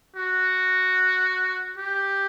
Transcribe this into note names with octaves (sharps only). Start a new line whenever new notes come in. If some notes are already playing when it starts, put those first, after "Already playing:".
F#4
G4